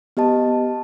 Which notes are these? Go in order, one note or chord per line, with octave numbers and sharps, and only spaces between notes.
B3 G4 D#5 A5